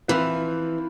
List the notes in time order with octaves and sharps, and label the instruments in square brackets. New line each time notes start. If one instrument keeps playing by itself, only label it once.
[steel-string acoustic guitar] E3 [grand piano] F3 C4 F4 B4